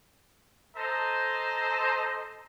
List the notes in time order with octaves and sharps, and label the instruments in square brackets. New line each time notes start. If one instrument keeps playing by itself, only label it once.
[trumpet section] A4 C5 D#5 A5 A#5